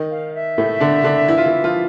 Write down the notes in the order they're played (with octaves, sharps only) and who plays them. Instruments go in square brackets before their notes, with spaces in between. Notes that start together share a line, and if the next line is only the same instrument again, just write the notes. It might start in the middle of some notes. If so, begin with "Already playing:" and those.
Already playing: [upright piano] D#3 D#4
[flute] F5
E5
[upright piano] A2 A3
D3 D4
D3 D4
E3 E4
F4
E3 E4
F3 F4